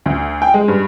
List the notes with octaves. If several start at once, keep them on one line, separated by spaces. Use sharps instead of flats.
D2
G5
G#3
G2